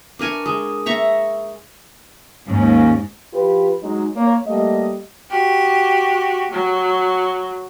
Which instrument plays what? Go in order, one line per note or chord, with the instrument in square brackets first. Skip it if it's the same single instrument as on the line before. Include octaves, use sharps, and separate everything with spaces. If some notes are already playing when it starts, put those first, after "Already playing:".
[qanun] D4 A#4 G#5 C#6
G#3
E5 A#5 C#6
[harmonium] D#2 C#4 [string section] G#2
[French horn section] F3 F4 G4 B4
F#3 G#3 D#4
A#3 C#5
G3 A3 A#3 D#5
[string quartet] F#4 G4
F#3